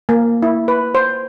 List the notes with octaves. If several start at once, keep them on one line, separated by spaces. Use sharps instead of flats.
A#3
E4
B4
C5